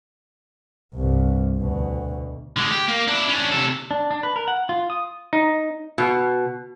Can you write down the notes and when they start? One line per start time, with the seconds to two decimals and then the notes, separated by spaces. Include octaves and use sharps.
0.94 C2 G2
1.59 D2 B2
2.57 D3 G#3
2.72 G4
2.88 A#3
3.08 D4 E4
3.29 C#4 D4
3.52 C3 A4
3.91 D4
4.11 D4
4.23 B4
4.36 A#4
4.48 F#5
4.69 F4
4.90 D#6
5.33 D#4
5.98 B2